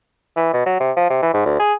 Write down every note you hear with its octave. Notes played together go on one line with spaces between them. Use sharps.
E3
B2
F#3
C3
F3
C3
E3
G#2
D2
G#4